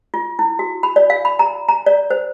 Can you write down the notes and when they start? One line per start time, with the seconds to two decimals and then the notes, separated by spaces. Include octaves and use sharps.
0.14 F4
0.39 E4
0.59 F#4
0.83 B5
0.96 D5
1.10 F5
1.25 B5
1.39 A#5
1.69 A#5
1.86 D5
2.10 C5